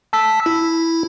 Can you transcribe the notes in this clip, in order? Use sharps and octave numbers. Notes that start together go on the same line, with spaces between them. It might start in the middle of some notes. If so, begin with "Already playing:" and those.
A5 E6 B6
E4